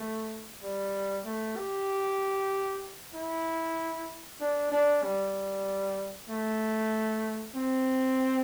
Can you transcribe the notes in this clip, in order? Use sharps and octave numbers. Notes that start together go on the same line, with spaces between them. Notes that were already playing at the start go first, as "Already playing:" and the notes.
Already playing: A3
G3
A3
G4
E4
D4
D4
G3
A3
C4